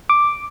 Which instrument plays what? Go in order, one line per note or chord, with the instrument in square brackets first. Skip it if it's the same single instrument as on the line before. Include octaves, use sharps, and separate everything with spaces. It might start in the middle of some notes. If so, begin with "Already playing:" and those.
[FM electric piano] D6